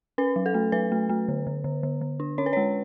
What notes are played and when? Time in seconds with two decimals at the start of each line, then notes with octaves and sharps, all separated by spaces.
0.18 C#4 B4
0.36 F#3
0.46 A4
0.54 A3
0.72 F#3 B4
0.92 A3
1.09 A3
1.28 D3
1.47 D3
1.64 D3
1.83 D3
2.01 D3
2.20 D4
2.38 C#4 C#5
2.46 B4
2.53 G#3 C#5